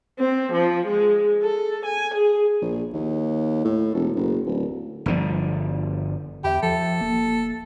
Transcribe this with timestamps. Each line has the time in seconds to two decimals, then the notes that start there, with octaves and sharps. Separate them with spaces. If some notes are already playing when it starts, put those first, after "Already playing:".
0.19 C4
0.52 F3
0.87 G#3
1.43 A4
1.85 G#5
2.15 G#4
2.62 A#1
2.94 D#2
3.65 A2
3.95 E1
4.16 F#1
4.46 D1
5.06 G1 D3 F3
6.44 E2 G4 E5 B5
6.63 F3 A4
7.01 D#1 A#3